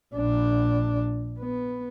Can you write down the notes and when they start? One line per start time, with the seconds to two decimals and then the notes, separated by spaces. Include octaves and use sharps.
0.15 A#1 D4
1.39 B3